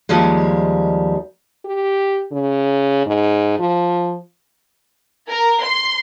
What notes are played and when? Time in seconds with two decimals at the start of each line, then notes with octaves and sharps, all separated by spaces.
0.09 D#2 F3 G3 G#3
1.65 G4
2.32 C#3
3.06 G#2
3.59 F3
5.30 A#4
5.63 C6